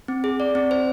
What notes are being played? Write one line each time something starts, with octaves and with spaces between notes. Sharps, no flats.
C4
G#4
D5
C4
C5